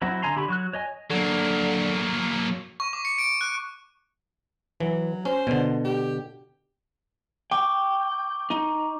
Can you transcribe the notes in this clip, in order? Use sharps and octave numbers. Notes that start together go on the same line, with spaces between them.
F#3 C4 E4 F#4
D3 E5 G#5 A#5 C6
D3 G4 B5 C#6
F#3 C#6 F#6
C#5 D#5 G#5
D3 F#3 A#3
C#6
D6
C#7
D7
F#6
E3 F#3
C#4 C5
B2 D3
G4
G5 C#6 D6
D#4